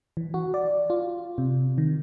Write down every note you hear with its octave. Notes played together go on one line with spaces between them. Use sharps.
E3
F#4
D5
F4
C3
D#3